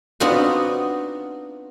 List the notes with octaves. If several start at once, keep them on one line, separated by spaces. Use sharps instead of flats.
B3 C4 D4 D#4 F4 F#4